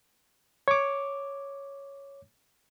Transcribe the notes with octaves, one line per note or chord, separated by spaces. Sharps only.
C#5 D6